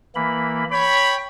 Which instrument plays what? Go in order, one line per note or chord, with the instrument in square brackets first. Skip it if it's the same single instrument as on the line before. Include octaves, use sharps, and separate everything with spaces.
[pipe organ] E3 A#3 B5
[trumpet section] C#5 B5 [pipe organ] G5